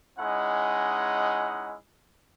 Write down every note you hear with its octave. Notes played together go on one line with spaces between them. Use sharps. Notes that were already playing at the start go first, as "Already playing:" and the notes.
G#3 C#4 D#4 E4 F#5